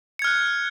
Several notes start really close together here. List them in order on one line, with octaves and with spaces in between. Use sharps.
C#7 G#6 F6 F#6